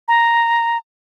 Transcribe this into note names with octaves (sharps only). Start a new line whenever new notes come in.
A#5